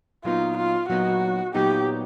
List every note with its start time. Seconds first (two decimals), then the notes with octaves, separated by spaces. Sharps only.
0.24 A#2 F#3 B3 D#4 F4
0.57 F4
0.89 A#2 F#3 B3 D#4 F#4
1.54 A#2 F#3 B3 D#4 G4